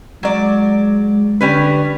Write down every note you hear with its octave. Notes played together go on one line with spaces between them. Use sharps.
F#3 G#3 D5
D3 G3 C#4 B4